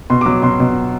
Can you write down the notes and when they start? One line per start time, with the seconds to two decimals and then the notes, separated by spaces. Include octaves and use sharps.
0.10 B2 C6
0.21 D6
0.26 F#3
0.32 D6
0.42 B2 C6
0.60 B2